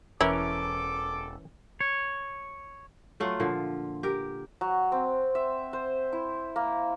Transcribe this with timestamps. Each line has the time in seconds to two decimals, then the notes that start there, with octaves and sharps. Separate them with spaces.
0.21 E1 E3 C#4 E4 A4 A#4 D6
1.81 C#5
3.20 F#3 A3 F4 F#5
3.40 A#2 D3 F3
4.03 G4 A#4
4.61 F#3
4.92 C4
5.35 E5
5.73 C5
6.13 E4
6.56 A#3